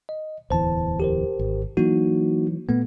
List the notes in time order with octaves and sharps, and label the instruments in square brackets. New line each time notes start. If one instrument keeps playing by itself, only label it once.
[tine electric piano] D#5
[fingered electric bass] D1 E2 E3 [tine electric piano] C5 A5
[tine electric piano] G4 A#4 C5
[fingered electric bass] G#1
[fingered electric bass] E3 F#3 [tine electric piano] A#3 D#4 F#4
[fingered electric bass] A#2 A3 [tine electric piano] B3